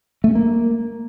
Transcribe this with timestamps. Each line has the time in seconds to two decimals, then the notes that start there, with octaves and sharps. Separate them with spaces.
0.24 A3
0.30 C#4
0.35 A#3